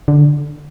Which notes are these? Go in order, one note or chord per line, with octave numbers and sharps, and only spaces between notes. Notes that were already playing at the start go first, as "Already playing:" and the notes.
D3